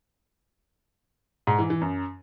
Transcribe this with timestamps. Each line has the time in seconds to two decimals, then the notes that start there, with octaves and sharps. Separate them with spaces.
1.47 G#2
1.59 E3
1.70 E3
1.81 F#2